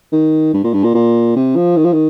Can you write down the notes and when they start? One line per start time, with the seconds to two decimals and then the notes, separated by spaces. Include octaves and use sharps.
0.12 D#3
0.54 G2
0.64 A#2
0.74 G2
0.83 A#2
0.94 A#2
1.36 C3
1.56 F3
1.77 D#3
1.85 F3
1.93 D#3